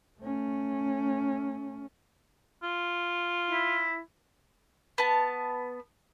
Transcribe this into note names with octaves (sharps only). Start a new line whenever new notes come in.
A3 C#4
F4
E4
B3 A5